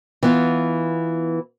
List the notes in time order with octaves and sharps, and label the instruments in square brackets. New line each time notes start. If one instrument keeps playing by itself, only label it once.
[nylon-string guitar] E3 B3 F4